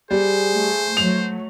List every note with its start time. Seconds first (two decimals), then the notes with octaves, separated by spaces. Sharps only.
0.11 G3 G#4 C5
0.54 A3
0.97 F#3 A3 F7